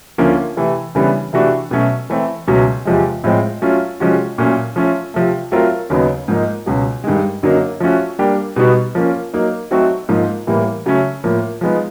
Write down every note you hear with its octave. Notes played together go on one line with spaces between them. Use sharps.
D2 D3 F3 A#3 C#4
C3 E3 A3
C#3 E3 G3 B3 D4
C3 E3 A3 D4 F#4
B2 F#3 A3 C#4
E3 A3 C4
C#2 B2 F#3 A3 C#4
E2 C3 F3 G#3
A2 F3 G#3 C4
F#3 A3 C#4 F4
C3 F3 G#3 C#4 F#4
A#2 F#3 A3 C#4
F3 A3 C#4
C3 F3 A3
F#3 A3 C4 F4 A#4
D#2 C#3 F#3 B3 D#4
G#2 F3 A#3 D#4
C#2 B2 F#3
G2 D#3 G#3
F#2 D3 F#3 A#3 D#4
F3 A3 C#4 F#4
G3 A#3 D4 G4
B2 G3 B3 D#4 F#4
F3 A#3 C#4
F#3 A#3 D#4
F#3 A3 C4 D#4 F#4
G#2 F3 A#3 D#4
A2 E3 G3 A#3
C#3 F#3 A3 C#4
A2 F3 A#3
F3 G#3 B3 D#4